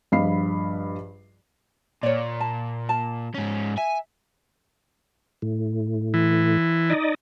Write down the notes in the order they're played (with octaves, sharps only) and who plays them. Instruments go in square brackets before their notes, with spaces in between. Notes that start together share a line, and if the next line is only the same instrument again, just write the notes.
[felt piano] A#1 G2 D#5 F5 B5 C7
[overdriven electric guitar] A#2 [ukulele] C#5 D5
[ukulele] A5
A5
[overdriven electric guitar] G#2 C#4
[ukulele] E5 [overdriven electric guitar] G#5
[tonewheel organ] A2
[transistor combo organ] E3
[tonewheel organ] D#4 D5 D#5